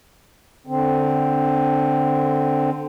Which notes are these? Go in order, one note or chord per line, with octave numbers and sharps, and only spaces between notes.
D3 C4